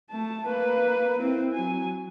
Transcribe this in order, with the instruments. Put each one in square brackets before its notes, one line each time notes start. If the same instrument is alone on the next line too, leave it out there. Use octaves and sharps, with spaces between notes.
[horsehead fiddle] A3 A5
A#3 B4
C4 E4
F#3 G#5